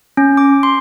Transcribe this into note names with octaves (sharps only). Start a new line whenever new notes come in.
C#4
D6
C6